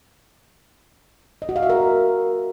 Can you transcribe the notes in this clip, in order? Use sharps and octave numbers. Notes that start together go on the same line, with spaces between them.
D#5
F#4
F5
E5
A#4